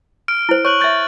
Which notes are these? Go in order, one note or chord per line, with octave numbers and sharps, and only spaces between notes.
F6 D7
E4 C5
C#5 C#6 F#6 F#7
E5 C#6 G6 A6